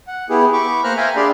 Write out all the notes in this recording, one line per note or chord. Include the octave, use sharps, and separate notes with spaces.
F#5
B3 E4 G4 G#4
B5 C#6 D6
A#3 C5 A#5 F6 F#6
E5 F5 G5 G#5 A#5
D4 G4 G#4 D5 B5 C6